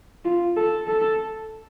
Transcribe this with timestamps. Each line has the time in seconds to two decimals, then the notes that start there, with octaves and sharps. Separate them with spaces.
0.25 F4
0.56 A4
0.88 A4